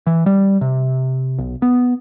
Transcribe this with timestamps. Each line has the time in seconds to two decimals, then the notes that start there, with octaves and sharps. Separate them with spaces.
0.07 E3
0.26 G3
0.61 C3
1.39 B1
1.62 B3